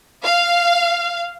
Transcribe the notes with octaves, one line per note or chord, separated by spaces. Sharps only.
F5